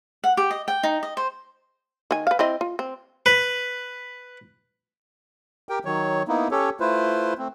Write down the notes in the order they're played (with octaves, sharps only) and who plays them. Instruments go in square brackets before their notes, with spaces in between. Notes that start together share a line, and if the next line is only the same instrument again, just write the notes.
[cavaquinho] F#5
G4
D#5
G5
D#4
D#5
C5
[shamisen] D#3 G#5
B4 F5
C4 E4 D#5
F4
C4
[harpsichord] B4
[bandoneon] G4 A#4 G5
D#3 F#3 C#5
A#3 B3 D#4 E4
C#4 G4 A4 C#5
A3 E4 F4 B4 C5
A3 C4